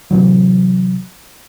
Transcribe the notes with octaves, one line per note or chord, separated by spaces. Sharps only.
C3 E3 F#3